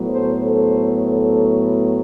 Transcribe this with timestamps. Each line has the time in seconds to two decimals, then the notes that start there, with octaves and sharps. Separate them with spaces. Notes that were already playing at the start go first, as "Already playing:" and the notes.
Already playing: A2 F#3 B3
0.10 A4 C5
0.41 A4 C5
1.03 A4 C5